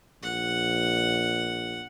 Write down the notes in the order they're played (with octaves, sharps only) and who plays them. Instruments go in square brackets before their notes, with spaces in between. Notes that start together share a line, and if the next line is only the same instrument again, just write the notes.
[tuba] A#1 [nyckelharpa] F#5